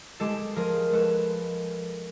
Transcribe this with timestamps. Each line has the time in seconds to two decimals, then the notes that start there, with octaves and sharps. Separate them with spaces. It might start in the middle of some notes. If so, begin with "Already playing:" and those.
0.20 G#3 G4 A4
0.56 F3 G#4 A#4
0.93 G#3 A4 B4